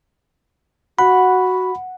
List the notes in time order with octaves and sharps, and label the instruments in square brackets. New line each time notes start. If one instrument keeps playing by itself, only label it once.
[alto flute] F#4 [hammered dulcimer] F#5 [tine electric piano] B5